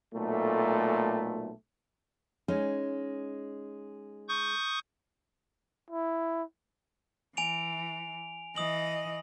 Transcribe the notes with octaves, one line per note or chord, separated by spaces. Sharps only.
B1 A#2 A3
G#3 C#4 D#4
C#6 D#6 G6
E4
E3 G#5 D7 F7
E3 D#5 D#6 F#7